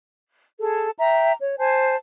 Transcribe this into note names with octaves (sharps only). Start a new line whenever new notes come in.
G#4 A4
E5 G5 A#5
C#5
C5 G#5 A5